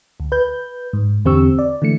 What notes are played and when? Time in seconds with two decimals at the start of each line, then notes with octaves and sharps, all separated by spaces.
0.20 D2
0.32 B4 G6
0.93 G#2
1.25 E2 D3 C4 G4 C#6 E6
1.59 D5
1.82 D3 E3 A3 C#7